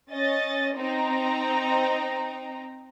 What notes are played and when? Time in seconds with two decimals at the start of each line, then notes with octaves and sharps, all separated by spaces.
0.11 C#4 D#5 A6
0.77 C4 D#4 A#5